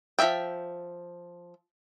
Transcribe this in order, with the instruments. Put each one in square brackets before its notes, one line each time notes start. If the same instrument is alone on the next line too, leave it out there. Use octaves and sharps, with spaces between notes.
[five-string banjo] F3 F#4 E5 G5